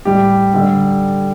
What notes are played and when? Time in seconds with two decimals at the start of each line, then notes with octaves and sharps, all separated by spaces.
0.05 A2 G3 G4
0.54 D3 G3 A4